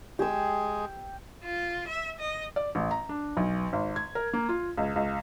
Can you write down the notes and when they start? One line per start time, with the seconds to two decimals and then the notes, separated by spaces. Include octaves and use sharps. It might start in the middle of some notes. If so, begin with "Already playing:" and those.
0.19 G#3 G4 G#4 E6
1.44 F4
1.88 E5
2.19 D#5
2.56 D5
2.75 A1
2.91 A#5
3.09 D4
3.37 B1
3.73 G#1
3.96 G#6
4.15 A#4
4.33 A#3
4.49 F4
4.77 C#2
4.96 C#2